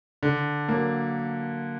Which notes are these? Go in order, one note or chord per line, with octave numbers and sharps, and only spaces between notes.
D3
F#3 A#3